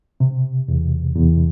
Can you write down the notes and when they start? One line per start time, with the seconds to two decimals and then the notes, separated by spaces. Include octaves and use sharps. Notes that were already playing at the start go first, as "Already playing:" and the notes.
0.20 C3
0.68 E2
1.16 E2